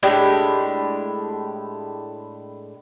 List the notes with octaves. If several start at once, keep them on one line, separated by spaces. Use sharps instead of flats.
A2 G#3 D4 G4